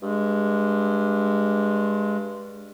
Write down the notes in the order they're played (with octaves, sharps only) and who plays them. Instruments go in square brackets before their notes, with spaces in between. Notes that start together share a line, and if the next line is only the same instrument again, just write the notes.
[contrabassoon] G2 [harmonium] G#3